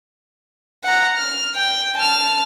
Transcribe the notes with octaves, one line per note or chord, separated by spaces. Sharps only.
F#5 A#5
F6
G5
A5 F6